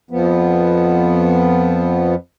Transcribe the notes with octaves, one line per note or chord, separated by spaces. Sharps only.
F2 F3 B3